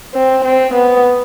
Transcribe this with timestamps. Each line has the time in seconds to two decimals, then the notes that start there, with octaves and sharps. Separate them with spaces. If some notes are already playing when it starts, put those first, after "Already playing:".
0.14 C4
0.45 C4
0.74 B3